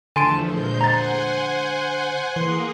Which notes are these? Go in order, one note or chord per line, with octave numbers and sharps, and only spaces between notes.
E2 D3 F3 A3 G#5 A5 C6 D7
A#2 G#3 C5 G6
F#5 G#5 A#5 A6
E3 A#3 G#4 C6